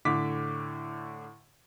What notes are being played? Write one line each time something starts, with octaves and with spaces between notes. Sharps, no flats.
A2 D3 D6 B6